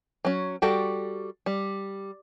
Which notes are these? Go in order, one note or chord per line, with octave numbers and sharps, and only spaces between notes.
F#3 C#4
G3 F#4 A4 G5
G3